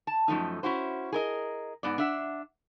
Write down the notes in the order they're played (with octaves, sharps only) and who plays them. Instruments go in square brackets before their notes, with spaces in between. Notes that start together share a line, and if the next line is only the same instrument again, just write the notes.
[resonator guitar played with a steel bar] A5
F#2 F3 A3 D#4
C#4 E4 F#4 C5
G#4 A#4 D#5
G#2 B3 D5
D4 E5 F#5